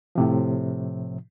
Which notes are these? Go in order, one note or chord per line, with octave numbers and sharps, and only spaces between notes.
A2 C3 F3